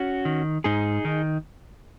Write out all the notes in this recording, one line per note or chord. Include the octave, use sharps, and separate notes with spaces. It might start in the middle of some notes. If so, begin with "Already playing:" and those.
Already playing: C#4 F#4
D#3
G#2 D#4 G#4
D#3